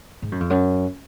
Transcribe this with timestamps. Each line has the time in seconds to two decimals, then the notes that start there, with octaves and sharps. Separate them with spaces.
0.22 G#2
0.32 F#2
0.40 F2
0.50 F#2